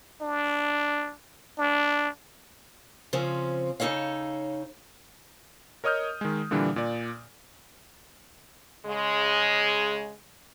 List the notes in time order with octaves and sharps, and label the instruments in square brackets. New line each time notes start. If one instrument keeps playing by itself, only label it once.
[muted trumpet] D4
D4
[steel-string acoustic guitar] C#3 F3 C4 C#4
C#3 D#4 A4 C#5 F5
[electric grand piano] A#4 C#5 D#5 D#6 F6 G6
D#3 G#3
A#2 D3 E3 G3 D4
A#2 D5
[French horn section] C#3 G#3